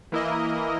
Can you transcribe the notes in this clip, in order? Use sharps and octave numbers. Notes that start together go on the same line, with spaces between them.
E3 A#3 E4 A#4 D#5